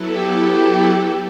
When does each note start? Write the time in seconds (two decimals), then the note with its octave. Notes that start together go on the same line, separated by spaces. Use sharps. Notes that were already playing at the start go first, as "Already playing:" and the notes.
Already playing: F#3 B3 E4 A4
0.16 G4